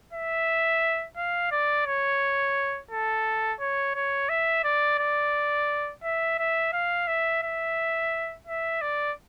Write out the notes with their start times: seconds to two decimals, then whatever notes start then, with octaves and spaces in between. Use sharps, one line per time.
0.13 E5
1.17 F5
1.52 D5
1.86 C#5
2.91 A4
3.61 C#5
3.95 C#5
4.29 E5
4.64 D5
4.99 D5
6.03 E5
6.38 E5
6.73 F5
7.07 E5
7.43 E5
8.47 E5
8.81 D5